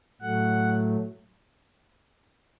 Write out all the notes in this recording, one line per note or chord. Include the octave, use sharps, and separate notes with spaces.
A2 F#3 A3 F#5